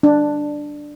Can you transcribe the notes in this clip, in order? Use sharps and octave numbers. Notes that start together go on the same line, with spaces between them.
D4